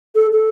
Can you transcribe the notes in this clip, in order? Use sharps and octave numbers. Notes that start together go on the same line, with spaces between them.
A4
A4